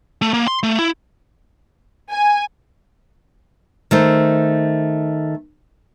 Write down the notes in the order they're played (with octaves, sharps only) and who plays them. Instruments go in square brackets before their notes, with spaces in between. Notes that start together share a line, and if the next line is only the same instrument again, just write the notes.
[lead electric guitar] A3
A#3
C6
A3
E4
[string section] G#5
[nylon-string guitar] D#3 A3 C5